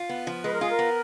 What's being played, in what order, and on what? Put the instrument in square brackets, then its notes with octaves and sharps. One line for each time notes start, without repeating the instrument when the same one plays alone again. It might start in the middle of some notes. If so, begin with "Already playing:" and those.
Already playing: [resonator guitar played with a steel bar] F4
B3
F3
[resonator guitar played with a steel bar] G#3 [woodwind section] B4
[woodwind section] A#4
[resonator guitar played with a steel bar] F4 [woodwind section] G#4
[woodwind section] A#4
[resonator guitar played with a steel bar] B3